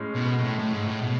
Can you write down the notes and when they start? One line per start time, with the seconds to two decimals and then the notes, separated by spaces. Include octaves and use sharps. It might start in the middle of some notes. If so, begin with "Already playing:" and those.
Already playing: A2 G#3 C#4
0.15 B2
0.38 B2
0.44 A2
0.59 A2
0.72 G#2
0.88 A2
1.02 B2